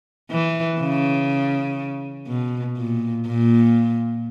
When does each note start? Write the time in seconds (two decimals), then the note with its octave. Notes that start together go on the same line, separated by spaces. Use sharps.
0.31 E3
0.81 C#3
2.27 B2
2.77 A#2
3.26 A#2